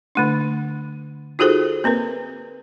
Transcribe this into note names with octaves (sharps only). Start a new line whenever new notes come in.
D3 A3 D4
D#4 F4 F#4 G#4 A4 C5
A#3 C4 A#4 B4